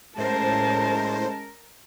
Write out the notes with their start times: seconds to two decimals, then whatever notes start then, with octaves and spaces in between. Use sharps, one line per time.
0.18 A2 G#3 C#4 A#4 C5 A5